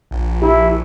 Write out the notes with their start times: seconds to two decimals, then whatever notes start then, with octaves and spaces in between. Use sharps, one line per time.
0.11 A#1
0.42 E4 G4